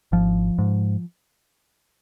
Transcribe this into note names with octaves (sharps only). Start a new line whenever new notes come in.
G#1 F3
G#2